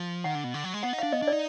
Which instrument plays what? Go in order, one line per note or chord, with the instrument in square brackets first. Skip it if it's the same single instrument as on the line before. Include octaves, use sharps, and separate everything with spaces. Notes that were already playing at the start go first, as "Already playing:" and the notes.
Already playing: [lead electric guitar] F3
[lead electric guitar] D#3 [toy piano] F#5
[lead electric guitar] D3
B2
D3
F#3
G#3
[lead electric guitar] B3 [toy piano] F#5
[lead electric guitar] D#4
[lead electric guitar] D4 [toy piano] F5
[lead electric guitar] B3 [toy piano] D#5
[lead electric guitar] D4
[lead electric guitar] D#4 [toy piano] D5